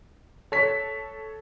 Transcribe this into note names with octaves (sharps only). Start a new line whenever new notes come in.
A4 C#5 B6